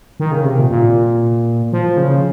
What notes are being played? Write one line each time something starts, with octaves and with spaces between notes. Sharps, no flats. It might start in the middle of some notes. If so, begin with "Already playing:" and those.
D#3
C#3
C3
A#2
A#2
F3
C#3